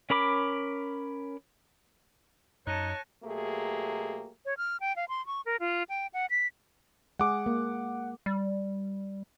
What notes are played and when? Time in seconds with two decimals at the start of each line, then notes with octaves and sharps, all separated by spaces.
0.10 C#4 A#4 B5 D6
2.67 F#2 D#4 C#5 A5 F#6 A#6 D#7
3.24 B2 F#3 A3 A#3 G4 G#4
4.45 C#5
4.58 F6
4.80 G5
4.96 F5
5.09 C6
5.26 C#6
5.46 A#4
5.60 F4
5.89 G5
6.14 F#5
6.30 B6
7.19 G#3 G#4 F#5 D6
7.46 A#3
8.26 G3